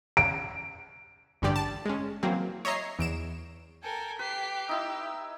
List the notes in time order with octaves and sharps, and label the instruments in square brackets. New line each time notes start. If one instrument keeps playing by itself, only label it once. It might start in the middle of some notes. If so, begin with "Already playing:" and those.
[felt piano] D7
[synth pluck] A1 G2 D3 G4 D5
A5
G#3 C#4
E3 F#3 A#3 C4
C#5 D#5 E5 A#5 C7
E2 D7 E7
[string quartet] A4 A#4 [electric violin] G5 G#5
[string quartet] G4 [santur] B4 [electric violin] B6 C7
[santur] D#4 E4 [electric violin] E6